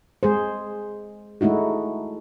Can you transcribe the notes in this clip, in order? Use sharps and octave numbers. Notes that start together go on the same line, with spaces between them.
G#3 G#4 C5
G#3 A3 D#4 E4 F#4